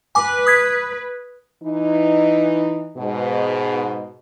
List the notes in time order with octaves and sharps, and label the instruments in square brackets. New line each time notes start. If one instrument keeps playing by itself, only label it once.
[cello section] B4 [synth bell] G#5 D6
[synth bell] D#6 G#6 B6
[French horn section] E3 D#4
G#2 B2